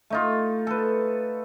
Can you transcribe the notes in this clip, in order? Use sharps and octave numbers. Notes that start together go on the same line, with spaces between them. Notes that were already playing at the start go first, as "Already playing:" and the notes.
A3 D#4 F4
A4 B4